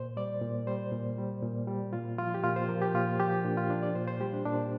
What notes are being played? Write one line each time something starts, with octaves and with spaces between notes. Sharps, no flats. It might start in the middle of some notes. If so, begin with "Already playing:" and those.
Already playing: A#2 C5
G3 D5
A#2
G3 C5
A#2
G3
A#2
G3
A#2 F4
F3 F4
G4
A#2 F4
C5
F3 A#4
G4
A#2 F4
F3 G4
A#2 D4
F4
F3 D4
D5
A#2 C5
C5
G3 G4
D4
A#2 D4